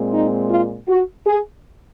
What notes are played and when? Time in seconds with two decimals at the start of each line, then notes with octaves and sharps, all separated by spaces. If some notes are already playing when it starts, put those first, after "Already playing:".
Already playing: A#2 G#3 C4
0.11 D#4
0.49 F4
0.88 F#4
1.26 G#4